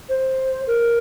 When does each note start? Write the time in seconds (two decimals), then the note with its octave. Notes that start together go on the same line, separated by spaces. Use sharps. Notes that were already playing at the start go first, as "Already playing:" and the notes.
0.09 C5
0.67 A#4